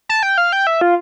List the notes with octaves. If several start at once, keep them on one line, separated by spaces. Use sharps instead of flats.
A5
G5
F5
G5
E5
F4